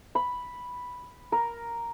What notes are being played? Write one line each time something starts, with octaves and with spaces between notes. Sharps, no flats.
B5
A#4